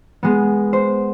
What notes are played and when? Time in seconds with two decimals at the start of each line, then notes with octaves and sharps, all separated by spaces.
0.23 G#3 B3
0.73 C5